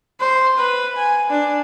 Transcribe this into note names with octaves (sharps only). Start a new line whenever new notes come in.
C5
B4
G#5
D4